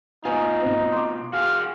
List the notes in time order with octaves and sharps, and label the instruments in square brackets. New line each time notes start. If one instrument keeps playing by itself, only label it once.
[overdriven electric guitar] B2 F4 [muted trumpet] D#4 [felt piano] B4 G#5
[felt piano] B1 C4
C6 D6
[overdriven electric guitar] F#4 G#4 [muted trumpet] F5